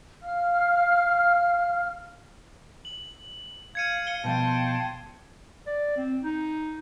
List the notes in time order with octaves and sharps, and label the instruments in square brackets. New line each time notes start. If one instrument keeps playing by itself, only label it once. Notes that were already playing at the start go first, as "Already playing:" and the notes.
[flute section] F5 F6
[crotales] F#7
[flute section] F5 [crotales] G#6 C#7 D#7
[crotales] C#7 D#7 G7
[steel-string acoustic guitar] B2 F3 F5 [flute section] G5 A5 C6
[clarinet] D5
C4
D#4